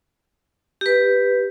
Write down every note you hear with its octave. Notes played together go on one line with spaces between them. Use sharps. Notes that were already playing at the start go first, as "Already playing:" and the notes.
G4 B4